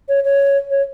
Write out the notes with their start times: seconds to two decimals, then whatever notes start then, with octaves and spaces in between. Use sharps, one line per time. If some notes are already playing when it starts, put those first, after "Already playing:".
0.09 C#5
0.24 C#5
0.71 C#5